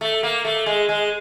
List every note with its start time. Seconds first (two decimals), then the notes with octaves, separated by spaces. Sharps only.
0.01 A3
0.23 A#3
0.45 A3
0.66 G#3
0.89 G#3